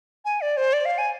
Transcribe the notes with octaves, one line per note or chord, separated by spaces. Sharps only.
G#5
D5
C5
D5
F5
G#5